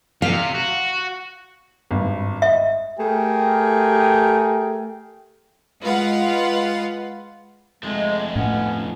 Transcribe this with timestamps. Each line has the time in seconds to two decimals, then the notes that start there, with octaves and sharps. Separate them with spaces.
0.22 C3 F5
0.55 F#4
1.91 G#1 G2
2.42 D#5 E5
2.99 A3 G4 G#4 A#4 G5
5.83 G#3 F4 B4 F5 F#5
7.83 F2 G#3 A3
8.36 A2 B3 C#4